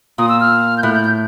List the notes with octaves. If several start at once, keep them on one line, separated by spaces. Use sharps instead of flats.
A#2 D#6
E6
F6
G6
A2 F#6
G6
G6